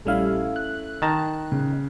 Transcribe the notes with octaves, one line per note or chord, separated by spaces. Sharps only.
A#1 G3 A3 C#4 E4 F5
F#6
D#3 A5 A#5
C#3